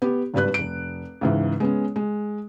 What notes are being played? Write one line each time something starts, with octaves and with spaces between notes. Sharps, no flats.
B3 G4
G#1 G2 G3 B4 F#6
F1 D7
C#2 G#2 E3
G#3 B3 C#4
G#3